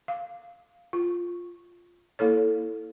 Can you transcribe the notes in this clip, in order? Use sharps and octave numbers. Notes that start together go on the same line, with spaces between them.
F5
F4
A#3 E4 A4 C#5